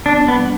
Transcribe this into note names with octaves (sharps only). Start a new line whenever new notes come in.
B3 D4
D4
B3
G3